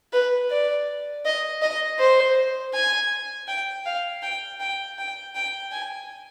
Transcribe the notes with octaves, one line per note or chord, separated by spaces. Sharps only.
B4
D5
D#5
D#5
C5
G#5
G5
F5
G5
G5
G5
G5
G#5